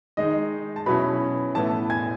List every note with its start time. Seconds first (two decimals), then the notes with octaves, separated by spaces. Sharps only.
0.17 D#3 G#3 D#4 D#5
0.76 A5
0.86 B2 F#3 C#4 E4 B4 B5
1.55 A2 E3 B3 E4 A4 A5
1.90 G#5 G#6